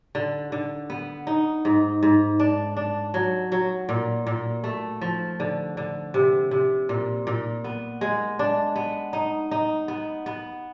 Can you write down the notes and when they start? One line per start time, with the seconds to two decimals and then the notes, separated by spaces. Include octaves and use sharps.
0.15 D3
0.52 D3
0.90 B3
1.27 D#4
1.65 G#2
2.03 G#2
2.40 D4
2.77 D4
3.14 F#3
3.52 F#3
3.89 A#2
4.27 A#2
4.64 A3
5.01 F3
5.40 D3
5.77 D3
6.14 C3
6.51 C3
6.89 A#2
7.27 A#2
7.64 B3
8.01 G#3
8.39 D4
8.76 B3
9.13 D#4
9.51 D#4
9.88 B3
10.26 B3